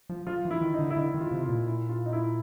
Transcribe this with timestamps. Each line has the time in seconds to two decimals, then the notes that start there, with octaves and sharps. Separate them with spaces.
0.10 F3
0.27 F3 F4
0.45 E3
0.51 E4
0.61 D#3
0.74 D#4
0.79 D3
0.90 E4
0.97 D3 D#4
1.14 D#3
1.20 F4
1.31 C3
1.43 F4
1.49 A#2
1.67 E4
1.89 F4
2.06 D#4
2.13 E4